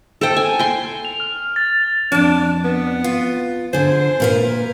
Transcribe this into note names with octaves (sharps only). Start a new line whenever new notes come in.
A4 C5 G5
G#5
G5 C6
F7
F6
A6
F2 D4 A5
B3
F4
D3 G#4 C5
A#2 A#4 B4